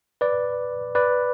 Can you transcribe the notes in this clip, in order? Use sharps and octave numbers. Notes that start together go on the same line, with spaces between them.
B4 D5
B4 D5